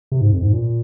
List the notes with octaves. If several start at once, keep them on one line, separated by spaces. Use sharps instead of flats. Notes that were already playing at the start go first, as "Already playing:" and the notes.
C3
G#2
F2
G#2
A#2